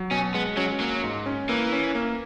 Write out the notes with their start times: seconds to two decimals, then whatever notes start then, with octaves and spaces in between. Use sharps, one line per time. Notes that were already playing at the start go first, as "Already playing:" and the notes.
Already playing: F#3
0.11 B2 C#4
0.34 G#3 B3
0.57 F#3 C#4
0.80 F#3 A#3
1.04 G#2
1.26 C#4
1.49 E3 A#3
1.72 C#4
1.95 A#3